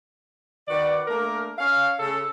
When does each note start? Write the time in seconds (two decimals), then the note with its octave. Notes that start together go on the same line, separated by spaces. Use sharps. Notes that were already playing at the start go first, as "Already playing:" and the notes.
0.68 D#3 F#4 B4 D5
1.07 A3 A#3 D4 A#4
1.59 C#4 C#5 F5
1.99 C#3 A4